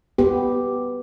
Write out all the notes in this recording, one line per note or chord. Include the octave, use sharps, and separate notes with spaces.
B3 G4